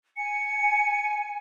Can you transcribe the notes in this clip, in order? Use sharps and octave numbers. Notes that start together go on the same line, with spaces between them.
G#5 C#7